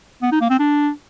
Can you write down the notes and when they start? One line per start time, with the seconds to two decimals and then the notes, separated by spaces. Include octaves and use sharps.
0.22 B3
0.31 D#4
0.41 A#3
0.50 C4
0.59 D4